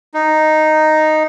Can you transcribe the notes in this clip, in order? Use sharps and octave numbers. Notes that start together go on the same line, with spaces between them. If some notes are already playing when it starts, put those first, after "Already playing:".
D#4